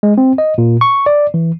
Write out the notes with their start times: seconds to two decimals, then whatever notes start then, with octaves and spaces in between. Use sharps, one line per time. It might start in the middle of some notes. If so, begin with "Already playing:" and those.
0.03 G#3
0.18 C4
0.38 D#5
0.58 A#2
0.81 C#6
1.06 D5
1.34 E3